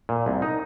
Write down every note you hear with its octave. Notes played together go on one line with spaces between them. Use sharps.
A#2
C2
D#4